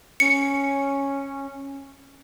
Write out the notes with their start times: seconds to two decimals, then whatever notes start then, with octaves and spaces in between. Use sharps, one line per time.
0.20 C#4 C#7